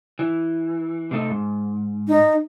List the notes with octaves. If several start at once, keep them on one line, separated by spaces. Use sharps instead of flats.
E3
C3 A3 D#4
G#2
D#4